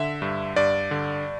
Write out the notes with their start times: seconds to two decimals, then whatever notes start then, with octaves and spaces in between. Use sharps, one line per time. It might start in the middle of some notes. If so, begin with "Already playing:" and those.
Already playing: D3 E5
0.22 G2
0.56 G2 D5
0.91 D3